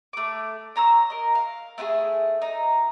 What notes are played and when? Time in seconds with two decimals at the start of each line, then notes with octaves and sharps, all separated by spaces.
0.13 A3 D6
0.76 C#5 A#5 C6 E6
1.10 A#4 D#5
1.35 F5
1.78 A3 E4 F4 G#4
2.42 D#4